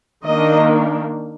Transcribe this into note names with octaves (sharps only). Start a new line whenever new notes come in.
D#3 A#3 D4 D#5